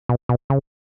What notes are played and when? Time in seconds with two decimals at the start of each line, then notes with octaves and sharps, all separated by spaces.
0.09 B2
0.29 B2
0.50 C#3